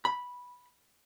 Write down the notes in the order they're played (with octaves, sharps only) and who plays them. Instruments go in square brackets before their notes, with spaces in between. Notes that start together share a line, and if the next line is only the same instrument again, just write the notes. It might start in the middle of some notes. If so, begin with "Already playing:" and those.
[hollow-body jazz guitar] B5